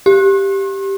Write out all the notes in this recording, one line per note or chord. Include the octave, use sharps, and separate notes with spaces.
G4